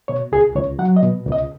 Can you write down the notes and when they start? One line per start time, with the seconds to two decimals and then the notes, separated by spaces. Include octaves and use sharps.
0.08 B2 C#5
0.32 C#2 G#4
0.56 C#2 C#5
0.79 F#3 F#5
0.96 D#5
1.03 B2
1.26 C#2
1.32 D#5